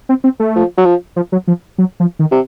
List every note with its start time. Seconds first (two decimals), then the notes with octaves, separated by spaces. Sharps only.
0.09 C4
0.24 C4
0.40 A3
0.56 F3
0.78 F#3
0.85 F3
1.16 F3
1.32 F#3
1.48 F3
1.78 F#3
2.00 F3
2.19 D#3
2.32 C3